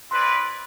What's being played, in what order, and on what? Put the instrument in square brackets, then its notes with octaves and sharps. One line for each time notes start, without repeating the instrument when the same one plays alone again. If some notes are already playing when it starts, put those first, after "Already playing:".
[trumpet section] C4 E4 B4 D5 [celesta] C6